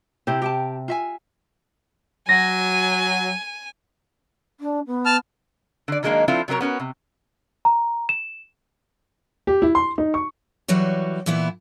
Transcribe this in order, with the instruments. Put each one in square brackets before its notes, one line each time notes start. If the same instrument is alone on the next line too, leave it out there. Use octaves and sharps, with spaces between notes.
[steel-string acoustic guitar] C3 [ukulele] E4 G4 C5
[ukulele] G4 G5 A5
F4 E5 G#5
[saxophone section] F#3 [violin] G#5 [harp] A#6
[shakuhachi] D4
B3
[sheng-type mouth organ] A5 F6
[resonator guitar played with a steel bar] D3 D5
D#3 F#3 G#3 A#3 D4 D#4
F3 C4 D4 E4 F4 A4
C3 F#3 E4 A#4 C#5
B3 C#4 F#4 A#4
C3
[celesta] A#5
E7
[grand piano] G4
E4
C6
D#4
C#6
[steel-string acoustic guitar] E3 F#3 G3 F#4 C#5
A#2 E3 B3 E4